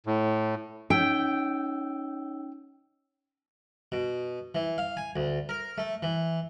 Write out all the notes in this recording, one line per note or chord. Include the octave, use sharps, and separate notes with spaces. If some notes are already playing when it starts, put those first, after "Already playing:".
A2
C#4 D#4 G5 E6
B2
E3
F5
G#5
D2
A#4
A3
E3